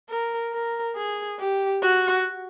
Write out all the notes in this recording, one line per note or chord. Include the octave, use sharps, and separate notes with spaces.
A#4
A#4
G#4
G4
F#4